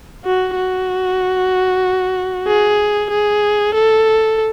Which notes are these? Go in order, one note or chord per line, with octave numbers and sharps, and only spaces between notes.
F#4
F#4
G#4
G#4
A4